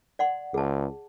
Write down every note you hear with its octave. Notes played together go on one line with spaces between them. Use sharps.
D5 F#5 C6
C#2 G#4 A5